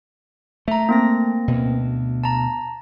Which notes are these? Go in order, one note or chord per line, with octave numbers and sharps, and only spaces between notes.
A3 E5 A#5
A#3 C4 A#6
D2 B2
A5 A#5